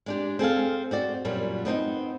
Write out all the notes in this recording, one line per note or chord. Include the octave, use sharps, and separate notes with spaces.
G#3 D4 G4
C4 G#4 A4 F5
C4 F#4 D5
F#2 A#2 F#3 G3
B3 C4 D4 D#4